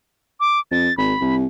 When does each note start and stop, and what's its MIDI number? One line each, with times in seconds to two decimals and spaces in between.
0.40 0.60 86
0.71 0.89 41
0.71 0.96 93
0.97 1.14 32
0.97 1.36 83
1.21 1.47 36